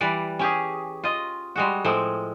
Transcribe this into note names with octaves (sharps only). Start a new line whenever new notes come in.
E3 G3 B4 D5
C#4 G4 G#4
F4 D#5
G3 G#3 F#4
A2 F3 G#3 C4